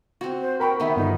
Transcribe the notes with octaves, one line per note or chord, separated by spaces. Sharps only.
C4 F#4
C5
A#4 G5 B5 C#6
D#3 B3 E5
G1 D#4